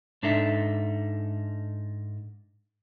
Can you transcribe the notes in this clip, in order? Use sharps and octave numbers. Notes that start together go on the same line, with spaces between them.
G#2 D4 D#4 A4 E5